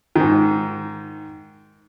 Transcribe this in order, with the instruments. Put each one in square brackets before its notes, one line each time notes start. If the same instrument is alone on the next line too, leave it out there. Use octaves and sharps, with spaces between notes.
[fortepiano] G#2 D#3